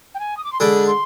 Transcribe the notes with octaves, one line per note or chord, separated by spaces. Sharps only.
G5
G#5
D#6
D6
C6
D3 G#3 D4 B5
C6